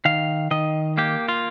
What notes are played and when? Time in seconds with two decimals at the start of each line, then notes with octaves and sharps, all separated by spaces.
0.05 D#3 F5
0.51 D#3 D#5
0.98 A#3 G4
1.29 F4